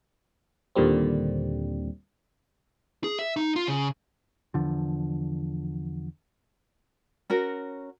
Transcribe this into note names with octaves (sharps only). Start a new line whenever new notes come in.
D#2 A#2 D3 G3 C4
G#4
E5
D#4
F4
C#3
E2 D3 F3
C#4 F#4 A#4